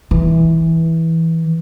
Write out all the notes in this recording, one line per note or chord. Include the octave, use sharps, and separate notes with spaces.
E3